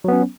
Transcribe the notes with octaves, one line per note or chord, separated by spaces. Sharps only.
F#3 B3 C#4